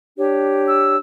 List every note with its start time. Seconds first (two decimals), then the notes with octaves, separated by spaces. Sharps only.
0.16 D4 G4 C#5
0.66 E6